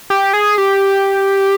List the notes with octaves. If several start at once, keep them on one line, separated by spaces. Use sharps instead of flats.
G4
G#4
G4